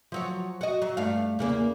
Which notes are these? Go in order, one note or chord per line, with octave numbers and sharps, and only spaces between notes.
F3 F#3 C#5
F#4 D#5
F#3
G2 A3 F5
E2 C#3 A#3